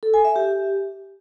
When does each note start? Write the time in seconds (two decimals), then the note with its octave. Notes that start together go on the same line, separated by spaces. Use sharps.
0.03 A4
0.14 G#5
0.25 E5
0.36 G4